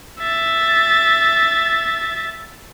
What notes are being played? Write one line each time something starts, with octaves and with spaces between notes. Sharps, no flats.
E5 A6